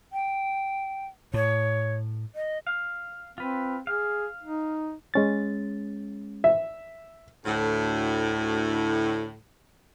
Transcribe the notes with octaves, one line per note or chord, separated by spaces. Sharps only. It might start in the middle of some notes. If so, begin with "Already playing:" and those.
G5
A2 C#5
D#5
F5
C4 F4 B4
G#4 F5 F6
D#4
G#3 C#4 A6
E5
D2 A2